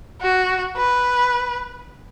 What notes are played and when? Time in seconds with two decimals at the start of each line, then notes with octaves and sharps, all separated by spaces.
0.21 F#4
0.77 B4